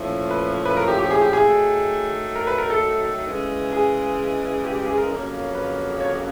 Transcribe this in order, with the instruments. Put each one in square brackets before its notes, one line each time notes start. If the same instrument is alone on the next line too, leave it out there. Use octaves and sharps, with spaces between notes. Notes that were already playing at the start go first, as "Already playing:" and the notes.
Already playing: [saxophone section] A#2 F3 A3 C#4 E4
[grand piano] B4
B4
A#4
G4
G4
G#4
G4
G#4
[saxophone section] D#3 F#3 A3
[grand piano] A#4
B4
A#4
A4
[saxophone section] C#3 E3 G#3
[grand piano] G#4
G4
G4
G#4
A#4
[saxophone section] F2 C#3 F#3 A#3 C#4
[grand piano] B4
C#5